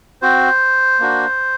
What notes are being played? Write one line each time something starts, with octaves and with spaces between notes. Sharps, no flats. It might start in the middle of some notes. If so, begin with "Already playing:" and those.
C4 F#4 C5
A#3 D4 F#4